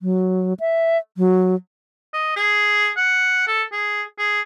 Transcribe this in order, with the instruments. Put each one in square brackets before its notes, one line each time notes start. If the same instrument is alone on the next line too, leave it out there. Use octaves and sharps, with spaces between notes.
[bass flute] F#3
E5
F#3
[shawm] D#5
G#4
F#5
A4
G#4
G#4